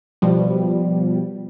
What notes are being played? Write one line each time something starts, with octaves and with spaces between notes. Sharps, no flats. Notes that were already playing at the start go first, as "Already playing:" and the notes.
B2 F3 G3